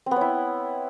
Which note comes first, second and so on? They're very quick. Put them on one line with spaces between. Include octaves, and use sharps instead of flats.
C4 B3 C#5 E4